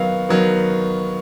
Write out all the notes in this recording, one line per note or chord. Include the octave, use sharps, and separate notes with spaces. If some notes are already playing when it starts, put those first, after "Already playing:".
Already playing: D#3 F#3 B3 F5
D#3 F#3 B3